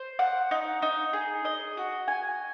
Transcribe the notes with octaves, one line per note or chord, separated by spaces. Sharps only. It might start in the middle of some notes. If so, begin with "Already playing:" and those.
Already playing: C5
F#5
D#4
D#4
G#4
D#5
F#4
G#5